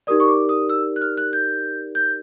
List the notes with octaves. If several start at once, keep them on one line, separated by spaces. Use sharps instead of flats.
D#4 G4 A#4 D5 D#6
C#6
D6
D#6
E6
F#6
F6
F#6
G6
G6